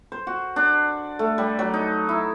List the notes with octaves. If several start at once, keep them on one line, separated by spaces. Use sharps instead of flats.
C5
F#4
D4
A3
G3
F#3
D#4
E4